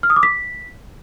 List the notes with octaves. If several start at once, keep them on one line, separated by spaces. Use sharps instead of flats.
F6
D#6
D6
B6